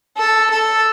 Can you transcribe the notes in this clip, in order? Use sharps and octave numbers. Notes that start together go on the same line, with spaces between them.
A4
A4